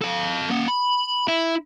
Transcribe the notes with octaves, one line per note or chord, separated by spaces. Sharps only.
A4 F5
A#3 F#5
B5
E4